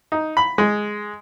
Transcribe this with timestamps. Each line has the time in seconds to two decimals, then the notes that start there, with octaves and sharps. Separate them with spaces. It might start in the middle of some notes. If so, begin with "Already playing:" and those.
0.12 D#4
0.37 B5
0.58 G#3